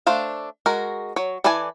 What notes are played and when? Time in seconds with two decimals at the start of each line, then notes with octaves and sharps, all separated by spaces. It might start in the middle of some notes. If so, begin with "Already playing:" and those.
0.06 A3 D4 C5 F5
0.66 G#3 F#4 A#4
1.16 F#3 C#5
1.44 E3 A4 B4 D5 G#5